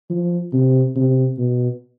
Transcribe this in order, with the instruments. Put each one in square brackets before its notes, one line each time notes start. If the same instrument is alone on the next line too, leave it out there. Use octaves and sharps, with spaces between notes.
[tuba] F3
C3
C3
B2